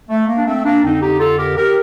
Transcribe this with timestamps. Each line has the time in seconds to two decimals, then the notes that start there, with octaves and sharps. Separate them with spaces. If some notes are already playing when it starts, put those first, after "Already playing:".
0.09 A3
0.27 A#3
0.36 D4
0.46 A3 C4
0.64 A#3 D4
0.83 F2 D3 C4 D#4
1.02 D#4 G4
1.20 F4 A4
1.39 G4 A#4
1.57 G4 A#4